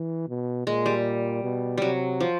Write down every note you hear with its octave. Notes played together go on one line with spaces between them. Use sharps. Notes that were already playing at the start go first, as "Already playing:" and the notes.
Already playing: E3
B2
A#2 G#3
G3
B2
C3 F#3 G3
F3